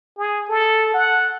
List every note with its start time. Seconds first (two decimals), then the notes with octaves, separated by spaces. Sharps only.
0.18 G#4
0.49 A4
0.94 F#5